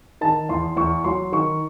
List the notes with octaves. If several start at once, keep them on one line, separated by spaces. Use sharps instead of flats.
D#3 A5
E2 C6
E2 C#6
F#3 C6
D#3 C#6